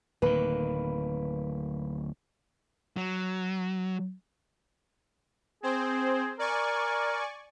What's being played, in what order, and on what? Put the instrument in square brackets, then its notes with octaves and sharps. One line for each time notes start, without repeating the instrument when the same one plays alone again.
[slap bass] D1 D#3 [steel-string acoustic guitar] A#3 B4
[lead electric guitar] F#3
[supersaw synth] C4 C5 [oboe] G#4
[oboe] A#4 [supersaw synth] D5 G#5 C#6